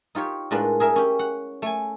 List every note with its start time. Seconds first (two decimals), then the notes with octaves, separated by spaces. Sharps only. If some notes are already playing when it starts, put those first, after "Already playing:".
0.15 D#4 F4 G4 C#5
0.51 A2 G#3 D4 F4 A#4 B4
0.80 G#4 A#4 E5
0.96 C#4 G4
1.19 F#5
1.62 A3 G#5